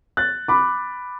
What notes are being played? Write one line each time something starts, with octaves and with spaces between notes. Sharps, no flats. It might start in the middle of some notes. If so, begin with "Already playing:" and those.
F#6 A6
B5 D6